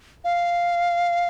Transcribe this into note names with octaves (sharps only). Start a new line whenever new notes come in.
F5